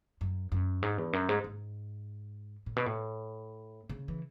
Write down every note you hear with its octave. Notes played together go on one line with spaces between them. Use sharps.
F#2
F#2
G#2
E2
F#2
G#2
G#2
A2
B2
A2
C#3
E3